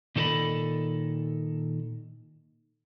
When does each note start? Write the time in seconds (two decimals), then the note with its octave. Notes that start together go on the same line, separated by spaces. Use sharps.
0.16 A#2 D#3 A4 A#4 D#5 B5